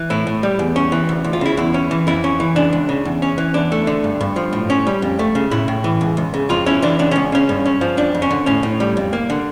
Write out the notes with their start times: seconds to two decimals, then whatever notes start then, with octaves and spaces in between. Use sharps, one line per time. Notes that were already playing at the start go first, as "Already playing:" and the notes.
Already playing: E3
0.10 A2 E4
0.27 A2
0.43 G3
0.59 E2
0.76 C#4
0.92 E3
1.09 D2
1.24 D2
1.33 F4
1.41 C#3 E4
1.57 E2 E4
1.74 C#4
1.91 E3
2.07 F2 E4
2.24 C#4
2.40 E3
2.56 C#2 D4
2.73 C#2
2.89 C#3
3.05 E2
3.22 C#4
3.38 E3
3.54 E2 D4
3.72 A3
3.87 D3
4.04 G2
4.21 G2
4.36 F3
4.53 A2
4.70 C#4
4.87 G3
5.02 F2
5.19 A3
5.35 C#3
5.51 A2 E4
5.68 A2
5.84 E3
6.01 C#2
6.17 C#2
6.34 C#3
6.50 F2 F4
6.66 C#4 E4
6.82 E3 D4
6.99 C#2 D4
7.11 C#2 C#4
7.32 C#3 C#4
7.49 G2
7.65 C#4
7.81 F3
7.97 F2 D4
8.15 F2
8.22 C#4
8.31 D3
8.46 A2 C#4
8.63 A2
8.80 G3
8.97 F2
9.13 A#3
9.30 D3